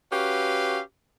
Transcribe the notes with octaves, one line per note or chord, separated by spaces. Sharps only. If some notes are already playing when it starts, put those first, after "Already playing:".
C#4 F#4 G4 B4 F5